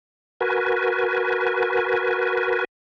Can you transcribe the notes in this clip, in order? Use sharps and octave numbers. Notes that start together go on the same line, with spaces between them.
F#4 A#4 B4 G#5